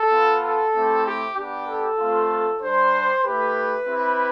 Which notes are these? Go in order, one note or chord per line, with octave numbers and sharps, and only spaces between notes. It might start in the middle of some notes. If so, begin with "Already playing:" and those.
Already playing: A4
B3 F4
A4
A3 C4 E4 G4
G4
B3 D4 G4
A4
A3 C4 F4
G3 D4 G4 C5
A3 E4 G4 B4
C4 E4 G4